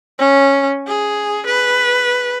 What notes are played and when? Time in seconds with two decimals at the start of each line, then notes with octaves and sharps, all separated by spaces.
0.19 C#4
0.88 G#4
1.46 B4